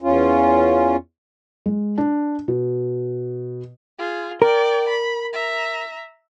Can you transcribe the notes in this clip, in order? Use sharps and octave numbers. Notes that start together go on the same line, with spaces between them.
E2 C#4 F4
G#3
D4
B2
F4 G#4
A#4 D5 G5
B5
E5 A#5